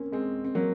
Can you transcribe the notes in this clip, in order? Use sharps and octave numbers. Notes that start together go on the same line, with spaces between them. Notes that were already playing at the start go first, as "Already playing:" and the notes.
Already playing: A#3 C4 C#4
G#3 C4
C4
F#3 A#3